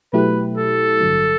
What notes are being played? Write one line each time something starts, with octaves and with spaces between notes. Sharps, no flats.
B2 F#3 A3 E4 G4 B4
A4
A1 G2 D3 F#3